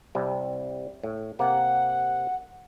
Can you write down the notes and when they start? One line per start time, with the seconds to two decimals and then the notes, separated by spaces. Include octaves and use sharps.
0.15 C2 C3 G3
1.03 A2
1.39 C3 A#3 F#5